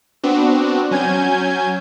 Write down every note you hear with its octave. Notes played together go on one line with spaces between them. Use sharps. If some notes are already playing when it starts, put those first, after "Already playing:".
B3 C4 D4 F#4
F#3 C#4 G#5 G6 G#6